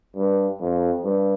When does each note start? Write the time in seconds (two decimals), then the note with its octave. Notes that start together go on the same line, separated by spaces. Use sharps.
0.16 G2
0.60 F2
1.04 G2